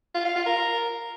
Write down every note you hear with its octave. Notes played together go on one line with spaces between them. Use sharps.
F4
F5
F4
A#4